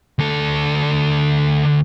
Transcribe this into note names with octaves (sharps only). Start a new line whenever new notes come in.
D2 A4